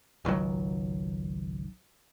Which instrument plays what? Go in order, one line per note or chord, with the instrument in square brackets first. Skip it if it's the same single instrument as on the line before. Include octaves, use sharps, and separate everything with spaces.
[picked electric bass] G#1 C#2 D#3 F#3